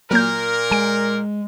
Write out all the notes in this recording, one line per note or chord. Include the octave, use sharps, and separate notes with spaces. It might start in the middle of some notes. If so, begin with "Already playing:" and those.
A#2 F#3 A#3 A#4 G6
G#3 G#5 D7